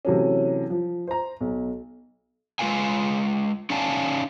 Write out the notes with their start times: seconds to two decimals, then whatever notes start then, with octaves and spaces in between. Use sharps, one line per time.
0.05 C3 E3 F#3 A3 C#4
0.70 F3
1.07 C5 A#5
1.41 B1
2.59 G#3 C4 F4 B4 F5 G#5
3.70 C#4 D#4 D5 F5 G#5 A5